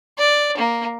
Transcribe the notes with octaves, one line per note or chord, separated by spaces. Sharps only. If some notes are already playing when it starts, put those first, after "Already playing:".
D5
A#3